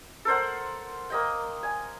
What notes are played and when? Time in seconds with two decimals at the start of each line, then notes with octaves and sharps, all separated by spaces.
0.25 A4 A#4 C5 F#5
1.10 A#3 D#5 G5
1.63 G#5